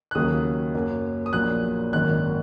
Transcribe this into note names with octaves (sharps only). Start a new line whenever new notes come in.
F#6
D#2 C#3 F#3 A#3 D#6
F#2 F#3 A#3
D#6
A#1 A#2 F#3 A#3 F#6
G#1 F#2 D#3 A#3 F#6